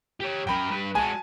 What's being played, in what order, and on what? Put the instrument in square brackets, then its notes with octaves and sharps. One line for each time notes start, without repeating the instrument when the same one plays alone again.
[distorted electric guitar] G4 C#5
[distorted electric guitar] F#2 A#4 [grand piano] G5 B5
[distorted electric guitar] G2 B4
[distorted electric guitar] G#3 F#4 [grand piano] G#5 A5